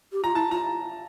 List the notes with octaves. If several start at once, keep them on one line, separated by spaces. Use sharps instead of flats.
G4
F4 A#5
E4 A5
F4 A#5